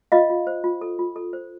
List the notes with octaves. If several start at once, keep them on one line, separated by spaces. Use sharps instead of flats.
F4 D#5 F5
F4
C5
F4
A4
F4
A4
C5